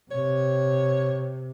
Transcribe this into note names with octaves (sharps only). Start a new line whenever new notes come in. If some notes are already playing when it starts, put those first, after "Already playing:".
C3 C#5